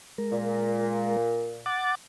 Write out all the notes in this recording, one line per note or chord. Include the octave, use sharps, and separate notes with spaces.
G#3 A#4
A#2
F#5 D6 A6